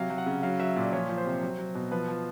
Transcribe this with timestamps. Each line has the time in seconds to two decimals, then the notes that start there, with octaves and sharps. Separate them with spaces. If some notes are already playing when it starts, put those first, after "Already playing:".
Already playing: C3 F#3 F5
0.10 F#3
0.18 F#5
0.26 C#3
0.43 F#3 F5
0.59 F#3 E5
0.76 A#2 D5
0.93 F3 C#5
1.09 F3
1.18 C5
1.26 C3
1.42 F#3
1.59 F#3
1.75 B2
1.91 F3 B4
2.08 F3